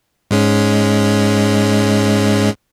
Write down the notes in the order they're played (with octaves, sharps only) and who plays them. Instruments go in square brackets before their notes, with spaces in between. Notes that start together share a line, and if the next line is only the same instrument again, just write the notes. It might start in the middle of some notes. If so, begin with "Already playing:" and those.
[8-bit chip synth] G#2 G#3 C#4